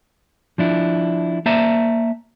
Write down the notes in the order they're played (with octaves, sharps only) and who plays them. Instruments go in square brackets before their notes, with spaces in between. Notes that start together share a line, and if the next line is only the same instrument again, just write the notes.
[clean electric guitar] F3 D4 E4
A#3 C5 D5 E5 A5 A#5